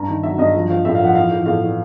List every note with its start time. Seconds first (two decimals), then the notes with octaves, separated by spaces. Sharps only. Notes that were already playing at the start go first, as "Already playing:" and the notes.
Already playing: G2 A#5
0.08 D#3
0.23 F#3 E5
0.38 G2 D#5
0.54 F3
0.70 F3 F5
0.85 A2 E5
0.95 F5
1.00 F3 F#5
1.15 E3 F5
1.31 E3
1.46 A2 F5
1.61 E3